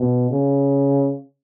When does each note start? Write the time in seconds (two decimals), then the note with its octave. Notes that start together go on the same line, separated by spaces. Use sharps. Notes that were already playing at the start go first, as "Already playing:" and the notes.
Already playing: B2
0.31 C#3